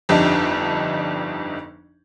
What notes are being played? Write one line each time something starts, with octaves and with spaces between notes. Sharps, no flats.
G1 F2 D4 D#4 G4